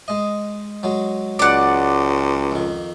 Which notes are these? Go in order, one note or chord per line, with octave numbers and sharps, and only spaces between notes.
G#3 D#5
F#3 G#3
C#2 D5 F#5
F2 D#3